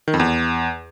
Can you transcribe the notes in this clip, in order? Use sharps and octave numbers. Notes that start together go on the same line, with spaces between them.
D#3
F2
E2